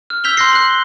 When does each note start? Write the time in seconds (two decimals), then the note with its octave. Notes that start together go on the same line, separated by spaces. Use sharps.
0.10 F6
0.24 E6 G6 B6 F7 G7
0.37 C6 F#6 G6 A#6 C7
0.53 F#6 C7 F#7
0.70 G7